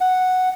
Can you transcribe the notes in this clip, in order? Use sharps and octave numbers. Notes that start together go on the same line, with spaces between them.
F#5